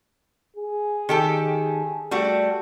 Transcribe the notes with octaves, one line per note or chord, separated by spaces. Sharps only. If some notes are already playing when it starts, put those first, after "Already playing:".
G#4
D#3 G4 A4
G3 A3 F#4